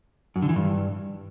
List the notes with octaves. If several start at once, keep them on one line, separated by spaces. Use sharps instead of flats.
F#2
D3
E3
G2